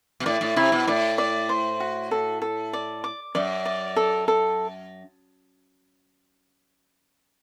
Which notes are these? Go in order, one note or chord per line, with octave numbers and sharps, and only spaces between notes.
B2
A2 D5
A2
C3 E4
B2
A2 D5
D5
C5
F#4
A4
A4
D5
D6
F#2 D5
D5
A4
A4